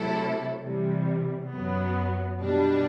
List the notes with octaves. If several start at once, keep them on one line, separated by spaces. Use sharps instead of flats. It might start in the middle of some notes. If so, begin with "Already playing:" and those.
Already playing: C3 F#3 A3 E4 A4
C3 E3 G3
F#2 F#3 B3
B2 G3 D4